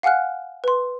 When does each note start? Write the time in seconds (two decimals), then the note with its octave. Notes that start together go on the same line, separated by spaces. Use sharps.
0.03 F5 F#5 G#5 F6 F#6
0.64 B4 C6